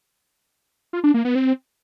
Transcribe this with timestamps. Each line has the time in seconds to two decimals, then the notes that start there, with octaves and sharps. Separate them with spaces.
0.93 F4
1.04 D4
1.14 A#3
1.25 B3
1.35 C4